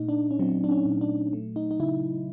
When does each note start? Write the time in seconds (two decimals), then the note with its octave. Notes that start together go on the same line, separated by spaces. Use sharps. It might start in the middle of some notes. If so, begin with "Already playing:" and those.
Already playing: A#2 A3 D#4
0.09 D4
0.31 C#4
0.39 F#3 C4
0.64 D4
0.71 C#4
0.86 A#2
1.01 D4
1.33 A3
1.56 D#4
1.71 D#4
1.80 C#3 E4